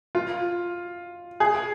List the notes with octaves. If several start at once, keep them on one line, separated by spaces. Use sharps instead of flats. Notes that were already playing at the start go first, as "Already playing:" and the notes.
F4
G#4